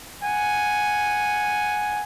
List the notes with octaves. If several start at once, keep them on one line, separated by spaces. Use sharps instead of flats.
F#5 G#5